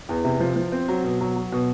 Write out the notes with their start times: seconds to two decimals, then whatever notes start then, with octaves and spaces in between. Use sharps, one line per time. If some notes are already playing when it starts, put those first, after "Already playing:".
0.09 E2
0.25 C3
0.40 F3
0.56 F3
0.72 C4
0.88 F#3
1.04 B2
1.21 F#3
1.36 F#3
1.52 B2